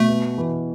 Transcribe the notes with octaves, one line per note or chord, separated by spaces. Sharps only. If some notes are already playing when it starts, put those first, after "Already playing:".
Already playing: B2 A3
B3
E3